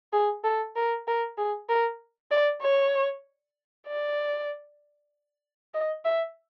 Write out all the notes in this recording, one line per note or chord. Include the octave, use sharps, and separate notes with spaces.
G#4
A4
A#4
A#4
G#4
A#4
D5
C#5
D5
D#5
E5